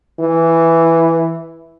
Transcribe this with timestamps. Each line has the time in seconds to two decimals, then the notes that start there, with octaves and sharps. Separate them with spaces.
0.19 E3